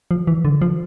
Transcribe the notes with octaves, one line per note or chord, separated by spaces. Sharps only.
F3
E3
D3
F3